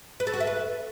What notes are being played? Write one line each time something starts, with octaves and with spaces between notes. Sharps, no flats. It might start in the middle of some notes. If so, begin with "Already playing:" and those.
B4
A4
F#4
E5
B4